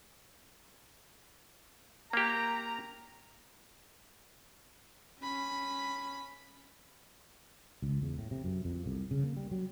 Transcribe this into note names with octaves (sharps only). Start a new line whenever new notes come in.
A#3 G4 A#5
C#4 B5
C#2
E2
A2
C3
F#2
F2
C2
C#3
A#3
G3
F#3